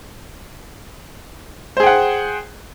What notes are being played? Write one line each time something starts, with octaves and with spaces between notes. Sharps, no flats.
G#4 C5 F#5 G5